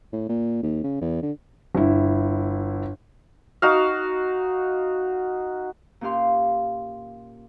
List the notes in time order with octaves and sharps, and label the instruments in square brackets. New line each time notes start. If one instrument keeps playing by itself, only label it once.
[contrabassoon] A2
A#2
D#2
C#3
E2
D3
[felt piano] G1 E4
[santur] D#4 F#4 F5
[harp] A#2 C#4 G4 F5 C6